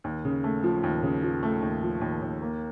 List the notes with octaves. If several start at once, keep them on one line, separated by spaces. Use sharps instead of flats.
D#2
C#3
A3
F3
D#2
C#3
F3
A3
D#2
F3
D#2
D#2
A#3